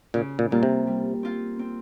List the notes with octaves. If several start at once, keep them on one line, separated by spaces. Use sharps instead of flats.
A#2 C#3
A#2
A#2 G3 A#3 F4
C3
G3
C4 F4
C4